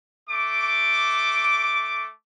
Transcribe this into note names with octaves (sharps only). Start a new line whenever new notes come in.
A3 D6